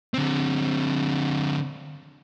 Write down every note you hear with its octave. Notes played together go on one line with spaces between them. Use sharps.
D3 C4